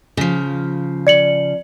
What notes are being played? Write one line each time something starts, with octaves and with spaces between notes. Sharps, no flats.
C#3 F3
D5 C#7 F#7